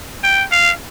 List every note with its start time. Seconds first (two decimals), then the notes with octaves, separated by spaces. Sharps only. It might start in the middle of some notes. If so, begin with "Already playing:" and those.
0.24 G5
0.52 F5